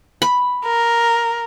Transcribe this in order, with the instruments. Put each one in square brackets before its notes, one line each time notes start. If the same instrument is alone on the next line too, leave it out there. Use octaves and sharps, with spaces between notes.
[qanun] B5
[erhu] A#4